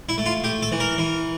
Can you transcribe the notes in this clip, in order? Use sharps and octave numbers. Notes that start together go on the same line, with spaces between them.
E4
A3
F4
A3 G4
A4
E3
A#4
E3